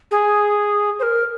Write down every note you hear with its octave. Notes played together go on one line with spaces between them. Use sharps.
G#4
C5
A#4